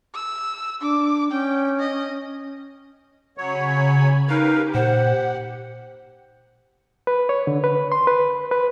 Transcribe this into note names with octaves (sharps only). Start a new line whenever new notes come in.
E6
D4 D6
C#4 G5
D#5
C#3 F#3 C#5 G#5 B5
D#4 G4 A#4 B4 F5
A#2 C5 F#5
B4
C#5
D3
B4
C6
B4
B4